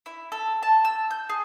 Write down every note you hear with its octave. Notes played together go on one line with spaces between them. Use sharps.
E4
A4
A5
E6
G6
G#4